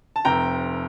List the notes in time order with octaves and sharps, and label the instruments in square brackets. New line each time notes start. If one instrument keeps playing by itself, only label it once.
[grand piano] A5
F1 F2 C3 G5 A#5